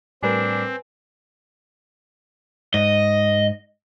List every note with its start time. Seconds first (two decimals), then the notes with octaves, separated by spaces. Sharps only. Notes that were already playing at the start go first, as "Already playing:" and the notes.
0.23 A2 G3 C4 D4 A#4 B4 G#5
2.74 G#2 D#5